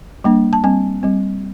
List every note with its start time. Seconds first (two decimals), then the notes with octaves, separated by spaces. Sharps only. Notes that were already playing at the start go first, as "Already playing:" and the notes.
0.24 G3 A#3 D4
0.53 A5
0.64 G3 C4 G#5
1.03 G3 C4